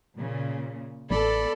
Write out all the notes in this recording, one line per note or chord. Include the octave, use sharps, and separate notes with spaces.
A#2 C#3
A1 B3 A4 D5 B5